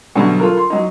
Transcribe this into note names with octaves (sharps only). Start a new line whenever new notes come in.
B2 D3 E3 F#3 G3
F4 A4 A#4
C6
F#3 D#4